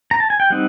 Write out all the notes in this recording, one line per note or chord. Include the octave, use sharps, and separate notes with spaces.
A#5
A5
G#5
G5
G3 C4 D#4 F#5